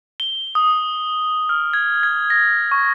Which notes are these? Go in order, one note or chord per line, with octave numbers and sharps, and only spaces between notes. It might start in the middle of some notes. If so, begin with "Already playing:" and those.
G7
D#6
F6
G#6
G#6
A#6
C#6